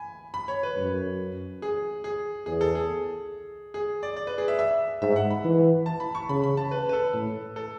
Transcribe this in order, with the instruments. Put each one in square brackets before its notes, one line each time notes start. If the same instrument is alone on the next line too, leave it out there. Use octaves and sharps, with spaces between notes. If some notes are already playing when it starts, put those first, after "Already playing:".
Already playing: [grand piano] G#5 B5
B5
C#5
B4
[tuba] F#2
[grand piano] G#4
G#4
[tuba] E2 [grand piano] G#4
[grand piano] A4
G#4
G#4
D5
D5
B4
G#4
E5
E5
[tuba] G#2 [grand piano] E5
[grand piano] F#5
B5
[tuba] E3
[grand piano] A5
B5
C#6
[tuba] C#3 [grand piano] B5
[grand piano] B5
A5
B4
B4
A4
[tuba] A2
[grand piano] A4